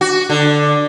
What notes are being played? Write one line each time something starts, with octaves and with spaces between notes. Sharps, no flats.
F#4
D3